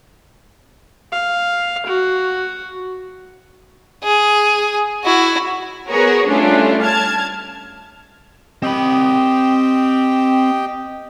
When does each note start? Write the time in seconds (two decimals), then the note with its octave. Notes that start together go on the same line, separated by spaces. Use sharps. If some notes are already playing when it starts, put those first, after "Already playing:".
1.12 F5
1.86 F#4
4.04 G#4
5.04 E4 F#4
5.88 B3 F#4 G#4 A#4 B4 C#5
6.28 G3 A3 C#4 D4 E4 F4
6.83 A5 F6 G#6
8.62 C4 G4 D#5 G5 B5